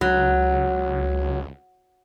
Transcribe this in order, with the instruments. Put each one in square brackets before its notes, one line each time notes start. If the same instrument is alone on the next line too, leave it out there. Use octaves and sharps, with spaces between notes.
[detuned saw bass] C#2 [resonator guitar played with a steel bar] F#3